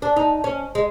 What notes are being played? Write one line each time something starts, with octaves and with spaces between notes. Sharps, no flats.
D4
D#4
C#4
G#3